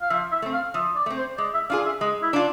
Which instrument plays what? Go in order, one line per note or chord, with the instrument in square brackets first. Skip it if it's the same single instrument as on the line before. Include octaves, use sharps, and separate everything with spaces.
[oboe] F5
[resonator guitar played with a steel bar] F3 [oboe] E5
[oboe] E5
[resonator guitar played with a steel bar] A3 C4
[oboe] F5
[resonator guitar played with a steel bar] F3 [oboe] E5
[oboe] D5
[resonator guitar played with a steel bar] A3 C4
[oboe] C5
[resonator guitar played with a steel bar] G#3 [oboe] D5
[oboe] E5
[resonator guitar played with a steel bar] D4 F4 G#4 [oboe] F5
[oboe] E5
[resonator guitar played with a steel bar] G#3
[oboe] E4
[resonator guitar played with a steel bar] D4 F4